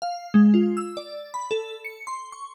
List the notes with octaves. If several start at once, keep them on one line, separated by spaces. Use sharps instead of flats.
F5
G#3
F4
E6
D5
B5
A4
C#7
C6
C#6